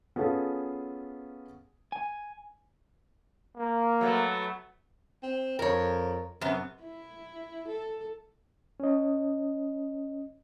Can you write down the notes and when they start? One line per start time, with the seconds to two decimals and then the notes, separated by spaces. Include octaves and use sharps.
0.16 B3 C#4 F4 G#4 A4
1.92 G#5
3.56 A#3
4.01 F#3 A3 B3
5.23 C4
5.59 F2 A#4 C#5
6.41 F#2 C3 B3
6.83 E4
7.68 A4
8.80 C#4 D#5